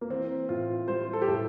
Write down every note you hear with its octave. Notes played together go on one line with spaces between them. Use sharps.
A#3
E3 C4
A2 F4
G3 C5
A4
G4
A2 A4